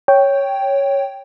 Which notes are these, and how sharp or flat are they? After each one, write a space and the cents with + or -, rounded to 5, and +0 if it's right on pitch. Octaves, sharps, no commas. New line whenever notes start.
C#5 +0 G5 +0